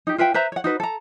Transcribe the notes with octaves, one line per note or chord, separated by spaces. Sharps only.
D#4 G4
F4 B4 E5 G5
B4 C5 E5 A#5
C#5 F#5
D#4 F#4 B4
A4 A#5